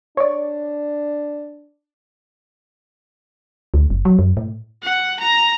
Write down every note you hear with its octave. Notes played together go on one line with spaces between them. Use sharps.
D4 C#5 D5
D2
F#1
F#3
F#2
A2
F#5
A#5